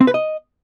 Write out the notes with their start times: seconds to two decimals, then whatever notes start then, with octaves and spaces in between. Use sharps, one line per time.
0.01 C4
0.07 B4
0.14 D#5